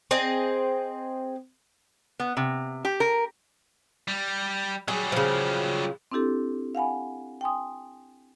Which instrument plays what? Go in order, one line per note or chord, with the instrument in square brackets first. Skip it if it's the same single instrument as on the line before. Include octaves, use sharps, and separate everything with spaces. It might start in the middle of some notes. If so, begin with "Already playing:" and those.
[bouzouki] C4 G#4 D#5
[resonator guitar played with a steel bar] B3
C3
G4
A#4
[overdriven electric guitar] G3
[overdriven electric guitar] F#3 G3 [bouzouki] G#4
[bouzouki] C#3 F3
[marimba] C4 D4 E4 G4 A4
F5 F#5 G#5 B5
G5 G#5 C6 D#6